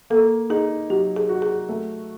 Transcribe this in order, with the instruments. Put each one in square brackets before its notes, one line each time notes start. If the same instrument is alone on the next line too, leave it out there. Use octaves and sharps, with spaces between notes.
[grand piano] A#3 [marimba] A4
[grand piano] D#4 [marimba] G#4
[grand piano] F#3 [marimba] G4
[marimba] G#4
[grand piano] F#4
[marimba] G#4
[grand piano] A3